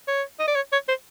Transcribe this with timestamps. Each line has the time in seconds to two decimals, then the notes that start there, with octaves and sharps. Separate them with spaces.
0.08 C#5
0.39 D#5
0.48 D5
0.55 C#5
0.72 C#5
0.88 C5